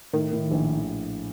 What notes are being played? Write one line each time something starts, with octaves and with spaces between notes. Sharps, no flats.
A2 D#3
A2
A#1